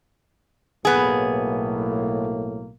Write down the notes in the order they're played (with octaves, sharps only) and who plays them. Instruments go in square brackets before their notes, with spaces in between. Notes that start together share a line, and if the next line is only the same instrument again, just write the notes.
[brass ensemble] B1 A2 A#3 [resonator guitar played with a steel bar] B3 G#4